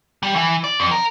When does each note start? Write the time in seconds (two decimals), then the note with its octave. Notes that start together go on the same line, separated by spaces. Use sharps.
0.23 G3
0.36 E3
0.64 D5
0.80 F2
0.91 A#4